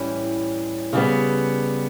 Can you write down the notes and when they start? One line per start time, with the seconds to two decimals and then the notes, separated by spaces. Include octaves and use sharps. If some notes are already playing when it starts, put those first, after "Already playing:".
Already playing: A2 E3 G3 C#4 E4
0.93 C#3 G3 B3